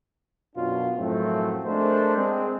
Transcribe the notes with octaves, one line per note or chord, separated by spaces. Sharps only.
F#2 B2 C#4 D4 F4
F#2 A2 F3 F#3 A3 C4
G#3 A3 D4 A#4 C5
G#3 C4